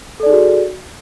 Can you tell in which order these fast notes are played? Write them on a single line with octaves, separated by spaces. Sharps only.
A4 D5 D#4 G#4 F#4